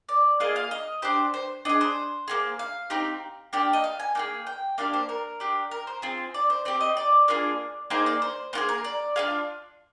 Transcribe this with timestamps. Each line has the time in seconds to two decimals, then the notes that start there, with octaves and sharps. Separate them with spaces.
0.09 D5
0.40 A#3 F4 G#4 D#5
0.56 F5
0.71 D#5
1.02 D4 G4 C5
1.34 C5
1.65 D4 G#4 D#5
1.81 C5
2.28 A#3 D#4 G#4
2.59 F5
2.90 C4 D#4 G4
3.53 A#3 D4 G4 G5
3.73 D#5
3.84 F5
4.00 G#5
4.15 A#3 D#4 G#4 G5
4.47 G5
4.78 A#3 D4 G4 F5
4.93 C5
5.09 A#4
5.40 D4 G4
5.71 A#4
5.87 C5
6.02 C4 F4 G#4
6.34 D5
6.50 C5
6.65 C4 G4 C5
6.81 D#5
6.97 D5
7.28 A#3 D4 F4 G#4
7.90 A#3 D#4 G#4 C5
8.06 D5
8.22 C5
8.53 A#3 F4 G#4 C5
8.69 A#4
8.84 D5
9.16 D4 F4 G#4 F5